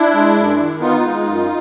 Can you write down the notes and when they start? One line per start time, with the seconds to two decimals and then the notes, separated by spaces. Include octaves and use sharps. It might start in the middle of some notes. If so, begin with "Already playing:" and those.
Already playing: D4 E4
0.14 G#3
0.36 F#2
0.59 D#3
0.80 B3 D#4 F4
1.03 G#3
1.25 F#2